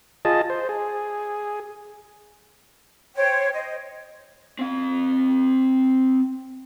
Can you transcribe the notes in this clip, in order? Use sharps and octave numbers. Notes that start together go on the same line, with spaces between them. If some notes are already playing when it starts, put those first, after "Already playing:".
F4 G#4 D#5 A5
C5
G#4
C5 C#5 G5
C5 D#5
C4 F5